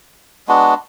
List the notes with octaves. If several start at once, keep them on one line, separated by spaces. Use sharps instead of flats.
G#3 B3 D4 F#4